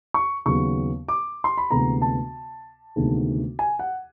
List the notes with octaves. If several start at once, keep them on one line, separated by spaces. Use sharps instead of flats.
C#6
D#2 C#3 F#3 B3 C#6
D6
C6
B5
D2 C3 E3 G#3 B3 A#5
A5
D2 C3 D#3 G#3 B3
G#5
F#5